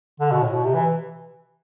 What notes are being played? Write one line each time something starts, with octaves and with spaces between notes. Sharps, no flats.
D3
B2
A2
B2
C3
E3